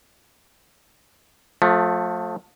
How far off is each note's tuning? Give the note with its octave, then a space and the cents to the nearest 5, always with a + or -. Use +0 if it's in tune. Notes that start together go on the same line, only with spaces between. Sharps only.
F3 +35 A3 +0